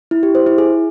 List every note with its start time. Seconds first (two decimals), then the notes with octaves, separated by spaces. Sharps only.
0.11 E4
0.23 G4
0.35 C5
0.46 E4
0.58 G#4